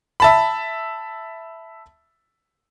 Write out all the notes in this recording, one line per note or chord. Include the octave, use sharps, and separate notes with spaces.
E5 A5 B5